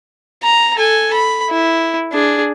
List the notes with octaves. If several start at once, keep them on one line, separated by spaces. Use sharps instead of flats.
A#5
A4 G#5
B5
E4
D4 G#4